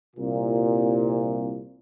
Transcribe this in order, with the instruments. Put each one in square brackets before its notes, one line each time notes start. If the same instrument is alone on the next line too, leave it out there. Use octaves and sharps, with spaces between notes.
[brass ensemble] C2 A#2